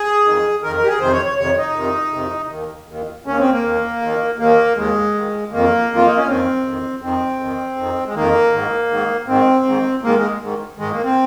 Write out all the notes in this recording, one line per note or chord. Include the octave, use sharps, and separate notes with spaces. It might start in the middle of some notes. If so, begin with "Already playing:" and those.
Already playing: G#4
F2 D#3
F2 D#3 A#4
A#4
G4
G#4
F2 C3 D#3 C5
C#5
C#5
F2 C3 D#3 C#5
D#4
F2 C3 D#3
F2 C3 D#3
D#2 D#3
D#2 D#3
D#2 D#3 C#4
C4
A#3
D#2 D#3
D#2 D#3
D#2 D#3 A#3
D#2 D#3 G#3
D#2 D#3
F2 D#3 A#3
F2 D#3
F4
D#4
C#4
F2 D#3 C4
F2 D#3
F2 D#3 C4
F2 D#3
F2 D#3
G#3
F2 D#3 A#3
G#2 D#3
G#2 D#3
G#2 D#3 C4
G#2 D#3
G#2 D#3 A#3
G#3
G#2 D#3
G#2 D#3 G#3
A#3
C4